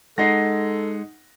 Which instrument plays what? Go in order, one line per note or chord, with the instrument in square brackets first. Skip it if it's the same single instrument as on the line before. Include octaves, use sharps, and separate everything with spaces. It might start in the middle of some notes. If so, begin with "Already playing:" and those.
[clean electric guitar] G#3 [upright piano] D#4 F#5 A#6 [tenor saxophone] A4